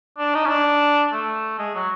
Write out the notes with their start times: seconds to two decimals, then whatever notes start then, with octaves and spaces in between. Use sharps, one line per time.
0.19 D4
0.34 D#4
0.45 C#4
0.50 D4
1.13 A3
1.59 G#3
1.75 F#3